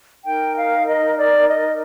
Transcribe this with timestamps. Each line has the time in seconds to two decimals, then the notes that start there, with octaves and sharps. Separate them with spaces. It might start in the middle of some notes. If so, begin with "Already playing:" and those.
0.25 D#4 A#4 G5
0.55 F5
0.85 D#5
1.16 D5
1.46 D#5